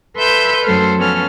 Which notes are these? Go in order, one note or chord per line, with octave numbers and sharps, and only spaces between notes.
A4 B4 E5 C6 E6 G6
F#2 F#3 A3 A4 C5 F6
F3 B3 C#4 A4 F6